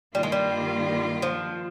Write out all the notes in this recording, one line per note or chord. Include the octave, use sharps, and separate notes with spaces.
G2 D#3 G3 A#3 F4
G#3
G3
F3